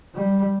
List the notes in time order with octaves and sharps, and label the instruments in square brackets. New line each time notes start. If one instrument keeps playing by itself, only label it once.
[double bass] G3